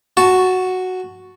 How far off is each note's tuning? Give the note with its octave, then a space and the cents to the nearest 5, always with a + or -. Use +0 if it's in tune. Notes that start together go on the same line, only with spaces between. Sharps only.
F#4 +0 A5 +0